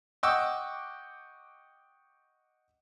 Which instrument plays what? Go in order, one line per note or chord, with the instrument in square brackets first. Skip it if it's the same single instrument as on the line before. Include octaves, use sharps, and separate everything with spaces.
[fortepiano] D#5 F#5 G5 C#6 D6 E6